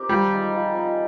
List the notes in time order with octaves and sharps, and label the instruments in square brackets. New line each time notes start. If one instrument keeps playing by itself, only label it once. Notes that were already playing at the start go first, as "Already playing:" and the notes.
Already playing: [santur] C4 G4 A#4
[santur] F3 [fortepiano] G3
[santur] C4 D#4 G#4
F3
C4 D#4 G#4